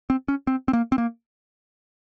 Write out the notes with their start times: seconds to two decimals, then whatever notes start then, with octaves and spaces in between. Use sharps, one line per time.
0.10 C4
0.28 C#4
0.47 C4
0.68 C4
0.73 A#3
0.92 C4
0.98 A#3